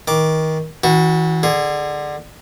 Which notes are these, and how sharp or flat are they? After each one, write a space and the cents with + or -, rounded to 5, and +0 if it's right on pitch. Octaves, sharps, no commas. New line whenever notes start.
D#3 +25 D6 +0
E3 -35 F#4 +0
D3 +20 G#4 +0